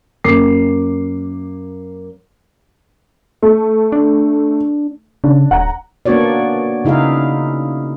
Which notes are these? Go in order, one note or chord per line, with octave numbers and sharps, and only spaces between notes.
F#2 A#3 D6 C7
A3
D4
C#3 D4
D#1 F#5 A#5
A#3 B3 D4 F#4 C#5 D5
C#3 D#4 E4 G#4 F5